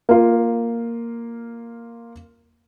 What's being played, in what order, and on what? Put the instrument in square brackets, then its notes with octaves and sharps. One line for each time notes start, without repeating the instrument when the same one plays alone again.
[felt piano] A#3 F4